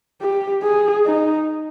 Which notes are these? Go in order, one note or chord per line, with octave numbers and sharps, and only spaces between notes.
G4
G#4
D#4